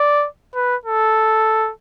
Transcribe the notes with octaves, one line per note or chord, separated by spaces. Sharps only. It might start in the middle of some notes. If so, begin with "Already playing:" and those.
Already playing: D5
B4
A4